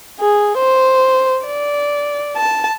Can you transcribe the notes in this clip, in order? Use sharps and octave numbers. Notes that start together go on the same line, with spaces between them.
G#4
C5
D5
A5